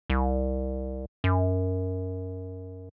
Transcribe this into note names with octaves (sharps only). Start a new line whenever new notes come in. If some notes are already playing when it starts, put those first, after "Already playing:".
C2
F#2